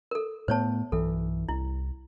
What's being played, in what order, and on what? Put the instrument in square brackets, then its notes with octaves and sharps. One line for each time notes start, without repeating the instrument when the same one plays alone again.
[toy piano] A4 A#4
[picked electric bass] A2 A3 B3 [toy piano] C5 C#5 A5
[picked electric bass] B1 G2 E3 [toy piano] A4
[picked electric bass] C2 [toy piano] E4